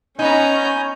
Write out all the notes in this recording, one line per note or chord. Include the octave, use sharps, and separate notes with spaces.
B3 C#4 D#4 G#5 A#5 G6